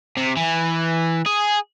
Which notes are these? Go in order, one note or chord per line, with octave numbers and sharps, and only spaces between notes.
C3
E3
G#4